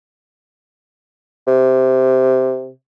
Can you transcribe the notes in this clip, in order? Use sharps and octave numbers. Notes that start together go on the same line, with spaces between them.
C3